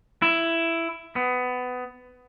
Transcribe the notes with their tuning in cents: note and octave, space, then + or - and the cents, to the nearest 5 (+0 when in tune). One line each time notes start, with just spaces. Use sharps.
E4 +10
B3 +20